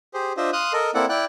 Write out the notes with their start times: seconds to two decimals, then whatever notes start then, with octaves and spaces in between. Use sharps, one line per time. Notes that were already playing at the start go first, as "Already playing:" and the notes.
0.14 G4 G#4 C5
0.37 D4 F4 C5 D#5 E5
0.53 F5 C6 D#6 F#6
0.73 A4 A#4 D#5
0.95 A#3 C4 E4 A4 D5 F#5
1.09 E4 D5 G5 F#6